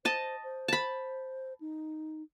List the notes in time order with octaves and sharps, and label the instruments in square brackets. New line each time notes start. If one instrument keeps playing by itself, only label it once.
[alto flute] C5 [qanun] D#5 A5
[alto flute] C5
[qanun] A5 B5
[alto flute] D#4